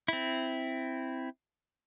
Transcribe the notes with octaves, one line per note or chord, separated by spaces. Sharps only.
C4 E4